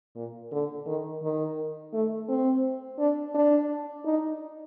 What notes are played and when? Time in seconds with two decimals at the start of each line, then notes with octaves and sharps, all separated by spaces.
0.15 A#2
0.52 D3
0.86 D#3
1.22 D#3
1.93 A3
2.29 C4
2.99 D4
3.35 D4
4.05 D#4